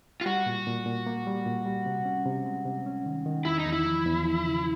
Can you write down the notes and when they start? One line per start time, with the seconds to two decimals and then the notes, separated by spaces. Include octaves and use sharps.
0.21 F4
0.26 G3 F#4
0.46 A#2
0.66 A#2
0.86 A#2
1.06 A#3
1.27 G3
1.46 A#2
1.66 G3
1.86 C3
2.05 C#4
2.26 C3
2.46 G#3
2.65 C3
2.86 C#4
3.06 D#3
3.26 D#3
3.45 E2 E4
3.59 D#4
3.66 E2
3.73 E4
3.85 F3
4.06 E2
4.25 F3
4.46 C#3